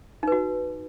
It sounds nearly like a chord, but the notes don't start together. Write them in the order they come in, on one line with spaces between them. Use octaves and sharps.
D#4 B4 F#4